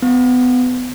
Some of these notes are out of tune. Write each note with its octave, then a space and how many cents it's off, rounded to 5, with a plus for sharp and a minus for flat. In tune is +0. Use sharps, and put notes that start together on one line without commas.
B3 +25